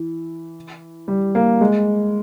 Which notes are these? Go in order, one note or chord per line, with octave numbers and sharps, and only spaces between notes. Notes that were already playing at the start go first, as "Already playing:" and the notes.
Already playing: E3
G3
A#3
G#3